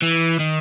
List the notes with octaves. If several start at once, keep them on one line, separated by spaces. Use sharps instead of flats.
E3
D#3